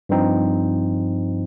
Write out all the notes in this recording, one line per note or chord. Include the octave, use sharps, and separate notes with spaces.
G2 F3 C4 D#4